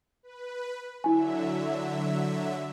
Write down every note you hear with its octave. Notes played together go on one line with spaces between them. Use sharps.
B4
D3 F#3 E4 E5 G#5